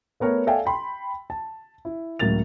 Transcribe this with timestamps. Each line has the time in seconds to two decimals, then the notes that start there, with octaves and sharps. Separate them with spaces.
0.20 A3 B3 A#4 C#5
0.47 A4 D5 E5 F5 G5 G#5
0.66 G5 B5 C6
1.30 A5
1.85 E4
2.19 C#2 A2 F#3 A#3 A6 F7